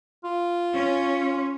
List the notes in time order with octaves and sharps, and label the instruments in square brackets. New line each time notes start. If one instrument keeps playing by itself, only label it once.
[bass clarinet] F4
[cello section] C#4